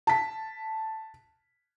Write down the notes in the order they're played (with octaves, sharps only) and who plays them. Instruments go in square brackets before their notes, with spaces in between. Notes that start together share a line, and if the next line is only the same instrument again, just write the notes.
[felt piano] A5 B6